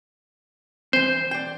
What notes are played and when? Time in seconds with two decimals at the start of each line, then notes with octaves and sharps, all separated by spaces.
0.93 E3 C4 C5
1.31 D5 G5